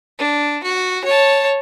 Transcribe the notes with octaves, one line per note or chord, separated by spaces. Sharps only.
D4
F#4
C#5 A5